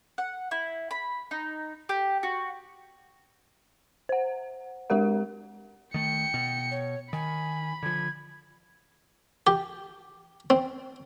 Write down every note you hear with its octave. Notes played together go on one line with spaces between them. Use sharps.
F#5
E4
B5
D#4
G4
F#4
C5 F#5
G#3 D4 G4 A#4 F#5
D#3 A3 G5 C#7
B2
C#5
D#3 G#5 B5
D3 F3 G#6
G4
C4